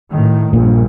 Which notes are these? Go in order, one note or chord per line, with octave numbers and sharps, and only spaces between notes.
A2 D#3
A#1 G2 A#2